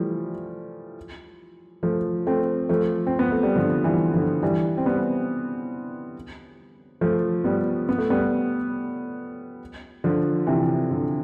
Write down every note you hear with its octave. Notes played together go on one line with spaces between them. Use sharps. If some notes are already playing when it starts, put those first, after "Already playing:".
Already playing: E3 F3 G3 A3
F3 A3
A3 C4
F3 A3
C4
B3
A3
G3
D3 F3
E3 G3
D3 F3
E3 G3
C4
G3 B3
F3 A3
G3 B3
B3
A3
G3 B3
D3 F3
C3 E3
D3